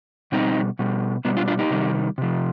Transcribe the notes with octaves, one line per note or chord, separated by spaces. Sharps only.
B2 G3 C4 D#4
B2 G3
B2 G3 B3 D4
D4 F4
D4 F4
D#4 G4
C3 D#3 G3
C3 F3